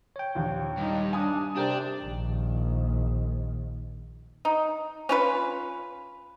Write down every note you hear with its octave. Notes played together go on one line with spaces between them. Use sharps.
C#5 G5
A#1 D#2
G2 D#4
D4 G#5 D#6
C3 D4 G4 A#4 C5 D5 G5
A#1 D#3
D#4
C#4 F4 B4